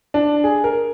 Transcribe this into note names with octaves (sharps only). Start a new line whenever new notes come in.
D4
G#4
A#4